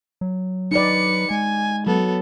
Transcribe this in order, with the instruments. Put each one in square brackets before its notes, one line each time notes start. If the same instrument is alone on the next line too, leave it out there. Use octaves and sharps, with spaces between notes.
[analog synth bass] F#3
[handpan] D#4 D5 [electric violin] B4 C#7
[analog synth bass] G#3 [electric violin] G#5
[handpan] F#3 [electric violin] B3 A4